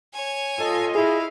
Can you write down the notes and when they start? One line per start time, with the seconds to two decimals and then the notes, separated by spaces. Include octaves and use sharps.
0.13 C#5 G#5
0.59 F4 A4 D#5
0.95 E4 G#4 F5